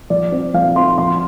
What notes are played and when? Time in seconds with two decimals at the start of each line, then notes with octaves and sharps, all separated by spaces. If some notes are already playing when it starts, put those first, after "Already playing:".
0.10 F3 D5
0.32 C4
0.54 F3 F5
0.76 C4 C6
0.98 F3 C6